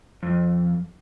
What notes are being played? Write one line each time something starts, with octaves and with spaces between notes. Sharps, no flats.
F2